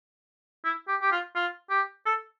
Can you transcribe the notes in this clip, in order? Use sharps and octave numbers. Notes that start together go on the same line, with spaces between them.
E4
G4
G4
F4
F4
G4
A4